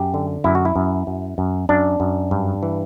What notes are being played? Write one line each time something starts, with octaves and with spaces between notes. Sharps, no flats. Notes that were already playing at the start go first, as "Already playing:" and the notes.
Already playing: F#2 G4
D3
F#2 E4
F#4
E4
F#2
F#2
F#2
F#2 D4
F#2
G2
E3